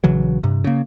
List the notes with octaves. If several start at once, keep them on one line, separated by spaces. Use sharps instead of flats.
A#1 C#3 E3 F#3
G2 C3
C#3 A#3